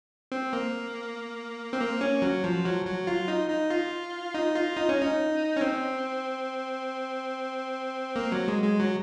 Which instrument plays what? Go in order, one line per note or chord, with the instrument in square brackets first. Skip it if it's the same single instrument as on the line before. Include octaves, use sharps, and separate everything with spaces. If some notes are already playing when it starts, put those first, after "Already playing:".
[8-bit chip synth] C4
A#3
C4
A#3
C#4
F#3
F3
F#3
F#3
F4
D#4
D#4
F4
D#4
F4
D#4
C#4
D#4
C#4
C4
A#3
F#3
G#3
G#3
F#3